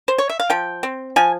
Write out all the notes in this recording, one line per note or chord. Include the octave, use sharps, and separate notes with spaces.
C5
C#5
E5
F5
F3 G5
C4
F3 G#5